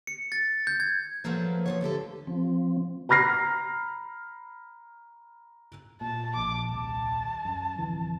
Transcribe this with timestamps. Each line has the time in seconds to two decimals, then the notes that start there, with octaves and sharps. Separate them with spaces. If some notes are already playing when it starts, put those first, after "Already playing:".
0.07 C#7
0.32 A6
0.67 G6
0.80 G#6
1.24 F3 F#3 A3 A#3 B4
1.66 B2 F3 C#5
1.81 D3 A3 G4 A4
2.27 F3 C4
3.09 A#5 B5 F6 A#6 C7
6.01 A#2 A5
6.36 A#1 D6
6.69 D#1 C2 A5
7.45 F#2
7.78 D1 F2 E3